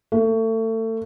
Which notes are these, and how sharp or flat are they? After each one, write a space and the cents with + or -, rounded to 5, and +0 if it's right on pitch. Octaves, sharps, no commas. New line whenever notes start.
A3 +30